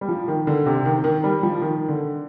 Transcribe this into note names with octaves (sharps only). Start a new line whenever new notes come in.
G3
F3
D#3
D3
C3
D#3
D#3
G3
F3
D#3
D3